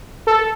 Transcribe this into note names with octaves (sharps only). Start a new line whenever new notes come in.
A4